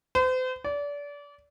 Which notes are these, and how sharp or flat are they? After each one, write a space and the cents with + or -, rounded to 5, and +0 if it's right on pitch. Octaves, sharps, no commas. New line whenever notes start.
C5 -40
D5 -30